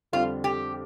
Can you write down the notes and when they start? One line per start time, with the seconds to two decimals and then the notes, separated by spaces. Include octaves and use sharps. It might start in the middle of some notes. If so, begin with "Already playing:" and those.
0.13 F2 D3 G3 C4 F4
0.44 G4